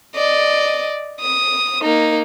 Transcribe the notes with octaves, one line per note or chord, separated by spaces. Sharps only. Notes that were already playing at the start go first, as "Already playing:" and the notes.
D5 D#5
D#6
A#3 D#4